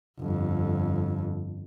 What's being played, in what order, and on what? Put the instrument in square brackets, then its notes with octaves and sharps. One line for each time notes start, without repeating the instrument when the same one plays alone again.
[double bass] G1 F2